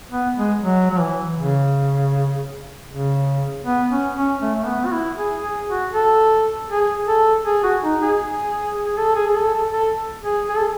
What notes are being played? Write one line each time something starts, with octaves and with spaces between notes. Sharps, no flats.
B3
G#3
F#3
F#3
E3
C#3
C#3
B3
C#4
C#4
A3
A3
B3
F#4
E4
G#4
G#4
F#4
A4
G#4
A4
G#4
F#4
D#4
G#4
G#4
A4
G#4
G#4
A4
A4
A4
G#4
G#4
A4